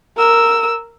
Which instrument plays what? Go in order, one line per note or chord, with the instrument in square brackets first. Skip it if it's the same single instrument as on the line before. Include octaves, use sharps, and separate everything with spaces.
[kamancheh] A#4 E6